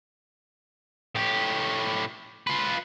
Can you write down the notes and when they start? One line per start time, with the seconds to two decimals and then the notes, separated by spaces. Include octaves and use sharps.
1.15 A2 G4
2.47 F4 B4